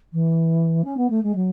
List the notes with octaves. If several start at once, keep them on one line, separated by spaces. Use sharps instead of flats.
E3
C#4
B3
A3
G#3
F#3